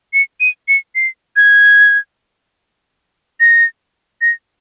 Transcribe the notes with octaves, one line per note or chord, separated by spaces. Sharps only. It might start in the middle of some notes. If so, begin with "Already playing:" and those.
C#7
D#7
C#7
C7
G#6
A#6
A#6